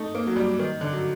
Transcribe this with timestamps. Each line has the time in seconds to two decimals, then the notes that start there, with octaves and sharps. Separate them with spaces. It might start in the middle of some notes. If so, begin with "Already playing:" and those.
Already playing: A3 D#4
0.15 A#3
0.27 F#3
0.36 G3
0.59 D#3
0.81 D3
0.92 F#3